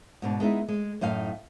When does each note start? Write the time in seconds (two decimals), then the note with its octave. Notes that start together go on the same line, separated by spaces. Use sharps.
0.22 G#2 B2 D4
0.40 G#3 B3 D#4 E4
0.68 G#3
1.01 F#2 A2 D#4 F5